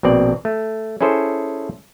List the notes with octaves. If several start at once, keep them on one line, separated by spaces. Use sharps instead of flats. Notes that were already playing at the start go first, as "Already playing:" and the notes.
A#1 B2 C4 D5
A3
C#4 E4 G#4 A4 C5